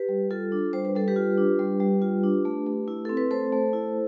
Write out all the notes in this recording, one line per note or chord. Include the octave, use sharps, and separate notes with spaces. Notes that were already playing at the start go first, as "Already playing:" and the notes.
Already playing: G4 B4
G3
F4 A4
D4
G3 C5
B4
G3 A4
G4 B4
F4
D4
G3
G3
F4
D4
A3
A3
E4
C4 A4
B4
A3 A4 C5
A3
E4